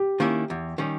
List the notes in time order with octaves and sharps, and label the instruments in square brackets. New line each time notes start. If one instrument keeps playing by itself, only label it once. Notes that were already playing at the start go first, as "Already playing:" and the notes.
Already playing: [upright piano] G4
[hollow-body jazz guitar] D#3 A#3 C#4 E4
E2
D#3 G3 C#4